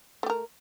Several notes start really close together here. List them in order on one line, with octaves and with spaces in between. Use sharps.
A3 G4 A#4